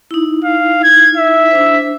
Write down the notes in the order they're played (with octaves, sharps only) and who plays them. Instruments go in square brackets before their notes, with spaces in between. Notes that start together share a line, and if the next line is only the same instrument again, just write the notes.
[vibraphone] D#4 E4
[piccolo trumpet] F5
G#6
E5
[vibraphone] D4 C5